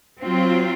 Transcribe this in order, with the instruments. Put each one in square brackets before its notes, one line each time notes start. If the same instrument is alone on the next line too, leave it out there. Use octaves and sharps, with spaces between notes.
[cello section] F#3 C4 F4